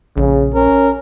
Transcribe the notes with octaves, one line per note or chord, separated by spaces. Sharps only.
A#1 C#3
C#4 A#4